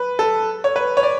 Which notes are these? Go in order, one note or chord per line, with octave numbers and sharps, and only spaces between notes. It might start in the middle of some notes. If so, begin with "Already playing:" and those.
Already playing: B4
A4
C#5
B4
C#5
D5